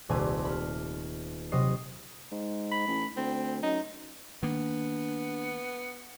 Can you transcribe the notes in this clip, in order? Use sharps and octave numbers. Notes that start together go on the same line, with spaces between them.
D#1 C2 A3 G#5 D6 D#7
B5 F6
C3 F#3 D#5 D#6 C7
G#2
B5
A1
D2 C4
F#2 D#4
D#3 A#3 B3 D4